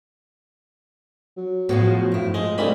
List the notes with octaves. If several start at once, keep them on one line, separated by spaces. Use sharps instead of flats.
F#3
A2 F3 B3 F#4 G#4
G2 E4
G#3 D#5
C2 G2 G#3 A3 D#4 B5